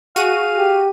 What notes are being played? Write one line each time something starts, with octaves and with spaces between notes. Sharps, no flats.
F#4 G#4 F5 D#7
G4